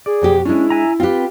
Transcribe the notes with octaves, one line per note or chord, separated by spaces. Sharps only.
G#4 D5
F2 B2 G4
G#3 C#4 D4 E4
E5 G#5 A#5
C4 F4 G4 B4